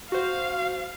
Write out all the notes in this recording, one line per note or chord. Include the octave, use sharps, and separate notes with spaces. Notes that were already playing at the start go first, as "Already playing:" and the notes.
F#4 C5 F5